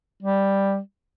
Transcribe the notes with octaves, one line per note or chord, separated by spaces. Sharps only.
G3